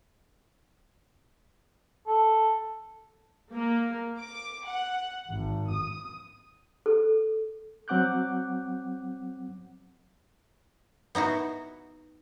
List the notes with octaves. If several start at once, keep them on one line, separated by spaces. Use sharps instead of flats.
A4
A#3
D6
F#5
G#1
D#6
A4
F#3 C4 F#5 D6 F#6 G6
B3 D#4 E4 F#4